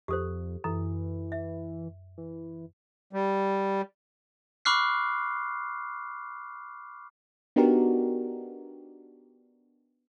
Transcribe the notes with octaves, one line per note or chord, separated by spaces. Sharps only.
F2 G4 A4 C5
F#2 E3 A4
E5
E3
G3
B5 C#6 D6 F6 F#6 C7
B3 D4 D#4 F#4 G4 A#4